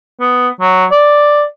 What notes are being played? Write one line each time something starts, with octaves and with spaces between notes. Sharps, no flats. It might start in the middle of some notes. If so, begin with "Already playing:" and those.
B3
F#3
D5